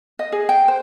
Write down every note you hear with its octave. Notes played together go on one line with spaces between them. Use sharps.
D#5
G#4
G5
C5